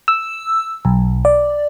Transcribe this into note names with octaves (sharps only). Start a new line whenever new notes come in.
E6
B1
D5